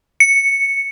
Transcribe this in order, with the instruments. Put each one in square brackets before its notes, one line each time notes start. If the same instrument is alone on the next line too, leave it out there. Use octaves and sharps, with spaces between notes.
[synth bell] C#7